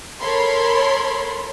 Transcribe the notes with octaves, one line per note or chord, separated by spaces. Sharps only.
A4 A#4 C#5 B5 C6